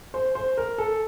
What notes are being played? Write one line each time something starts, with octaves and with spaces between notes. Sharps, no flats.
C5
C5
A#4
A4